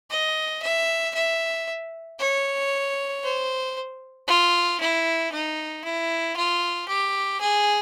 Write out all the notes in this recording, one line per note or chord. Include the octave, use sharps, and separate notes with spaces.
D#5
E5
E5
C#5
C5
F4
E4
D#4
E4
F4
G4
G#4